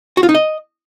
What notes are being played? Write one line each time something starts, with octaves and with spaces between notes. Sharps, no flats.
F#4
F4
D#4
D#5